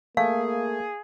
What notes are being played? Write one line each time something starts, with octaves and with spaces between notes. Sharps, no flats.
A3 A#3 G#4 F5